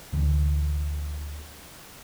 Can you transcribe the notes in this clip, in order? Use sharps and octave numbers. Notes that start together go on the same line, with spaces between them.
D2 D3 E3